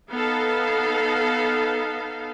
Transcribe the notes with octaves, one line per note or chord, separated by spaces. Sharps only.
B3 D#4 A4 F5